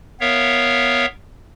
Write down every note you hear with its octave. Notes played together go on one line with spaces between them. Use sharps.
B3 A#4 C#5 E5 F5